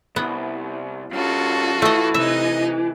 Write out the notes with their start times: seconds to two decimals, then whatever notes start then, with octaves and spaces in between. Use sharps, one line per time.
0.16 C2 B3
1.13 G3 C#4 F4 F#4 A4
1.82 E3 A3 D#5
2.14 C3 D#4 D#5 E5